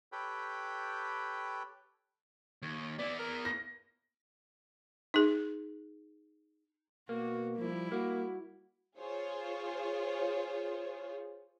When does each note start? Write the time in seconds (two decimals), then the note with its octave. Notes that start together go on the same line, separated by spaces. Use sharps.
0.12 G4 A4 B4 C#5 G5 B5
2.62 D#2
2.99 B3 E4 D5
3.19 A#4
3.45 A#6
5.14 D#4 G#4
7.09 B2 A#3 F#4
7.58 F3 G3 E4
7.92 A#3 F#4
8.99 F4 G#4 C5 C#5